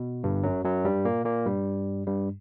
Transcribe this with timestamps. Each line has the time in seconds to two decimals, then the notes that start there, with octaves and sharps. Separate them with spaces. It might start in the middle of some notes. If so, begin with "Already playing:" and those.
Already playing: B2
0.24 G1 G2
0.43 F#2 F#3
0.64 F#2 F#3
0.84 G2 G3
1.05 A#2 A#3
1.25 A#2 A#3
1.46 G2 G3
2.07 G2 G3